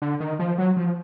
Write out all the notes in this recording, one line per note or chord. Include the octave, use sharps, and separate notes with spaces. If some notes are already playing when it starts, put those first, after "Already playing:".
D3
D#3
F3
F#3
F3